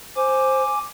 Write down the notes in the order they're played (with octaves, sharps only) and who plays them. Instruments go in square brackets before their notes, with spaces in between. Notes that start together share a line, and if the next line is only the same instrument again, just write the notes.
[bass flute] C5 [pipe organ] G#5 D6